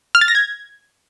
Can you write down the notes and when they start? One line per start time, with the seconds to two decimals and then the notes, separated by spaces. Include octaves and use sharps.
0.15 F6
0.21 A6
0.28 A#6
0.35 G#6